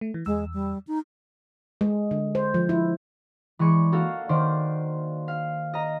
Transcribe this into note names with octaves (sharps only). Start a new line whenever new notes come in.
A3
E3
E2 G#3 E6
G3
D#4
G#3
D3
C5
F3
E4
E3 G#3 D5 C#6 G#6
A#3 F#4 A4 F5
D#3 C5 D5
F5
D#5 A#5